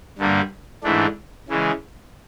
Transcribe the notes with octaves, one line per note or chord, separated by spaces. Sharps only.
G2 D3 G3 A#3
G#2 E3 A3 D4
C#3 E3 G#3